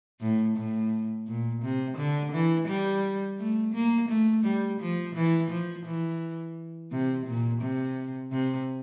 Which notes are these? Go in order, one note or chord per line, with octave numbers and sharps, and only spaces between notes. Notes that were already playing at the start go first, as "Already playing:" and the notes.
A2
A2
A#2
C3
D3
E3
G3
A3
A#3
A3
G3
F3
E3
F3
E3
C3
A#2
C3
C3